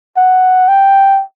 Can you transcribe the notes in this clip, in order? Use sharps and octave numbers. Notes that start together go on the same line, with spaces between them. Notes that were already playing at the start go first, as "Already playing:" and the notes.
F#5
G5